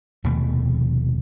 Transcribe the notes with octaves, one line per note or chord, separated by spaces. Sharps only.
F1 D#2 B2 A3